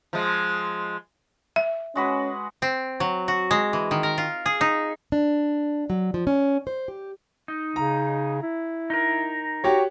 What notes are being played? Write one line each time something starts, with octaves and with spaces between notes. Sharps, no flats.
F3 G#3
E5
G#3 C#4 F#4 B4
C4
F#3
F#4
G#3
E3
D#3
A#4
F4
G#4
D#4
D4
F#3
F3
C#4
C5
G4
D#4
C#3 A#5
E4
D#4 A#4
F#4 G4 C#5